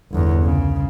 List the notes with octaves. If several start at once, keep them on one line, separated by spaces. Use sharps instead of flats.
G1 E2
C2 C#3